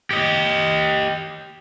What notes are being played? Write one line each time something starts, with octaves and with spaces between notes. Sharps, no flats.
G4 D#5